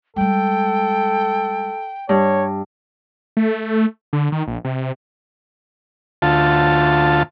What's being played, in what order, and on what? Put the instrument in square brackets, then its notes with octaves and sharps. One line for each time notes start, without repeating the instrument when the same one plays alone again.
[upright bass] G3 G#3 [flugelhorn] A4 [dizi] G5
[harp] G2 [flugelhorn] C#5
[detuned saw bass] A3
D3
D#3
A#1
C3
[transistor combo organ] D2 F4 A5